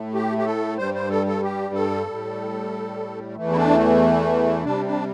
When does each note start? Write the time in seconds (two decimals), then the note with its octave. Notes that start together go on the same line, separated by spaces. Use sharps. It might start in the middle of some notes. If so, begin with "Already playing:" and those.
Already playing: A2 A3
0.14 G4
0.38 G4
0.46 A4
0.78 G2 G3 C5
0.94 C5
1.10 A4
1.27 A4
1.43 G4
1.74 A4
2.06 A2 G3
3.36 E2 E3 A3
3.52 E4
3.57 D4
4.64 C3 G3 D4
4.81 C4
4.86 D4